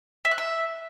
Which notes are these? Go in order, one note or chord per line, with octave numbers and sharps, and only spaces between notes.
E5
F#6
E5